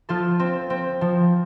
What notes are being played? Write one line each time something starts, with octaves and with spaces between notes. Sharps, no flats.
F3 F4 A4
C4
C4
F3